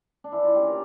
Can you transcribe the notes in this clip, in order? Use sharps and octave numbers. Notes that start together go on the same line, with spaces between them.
D4
E3 E4
F4
A#3 C#4 G4
A#4